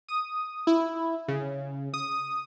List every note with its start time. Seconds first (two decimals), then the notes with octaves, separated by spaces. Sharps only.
0.08 D#6
0.67 E4
1.28 C#3
1.94 D#6